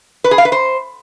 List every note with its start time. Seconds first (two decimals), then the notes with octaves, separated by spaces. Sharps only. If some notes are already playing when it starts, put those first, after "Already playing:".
0.24 B4
0.31 G#4
0.38 F5
0.45 B4
0.52 C5